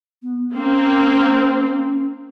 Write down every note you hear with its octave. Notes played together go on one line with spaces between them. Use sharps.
B3
A#3 C4 C#4